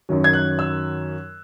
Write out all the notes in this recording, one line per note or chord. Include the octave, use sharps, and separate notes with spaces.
F#2 D#3 F#3
G#6
F#6
E6